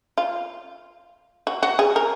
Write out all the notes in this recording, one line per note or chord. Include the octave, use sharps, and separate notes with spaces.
F4
F#4
F#4
G#4
A#4